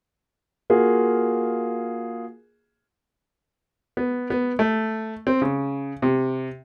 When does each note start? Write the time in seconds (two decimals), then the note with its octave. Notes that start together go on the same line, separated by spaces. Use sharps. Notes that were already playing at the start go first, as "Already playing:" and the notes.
0.70 A#3 F4 F#4 G#4
3.97 B3
4.30 B3
4.59 A3
5.27 C4
5.42 C#3
6.02 C3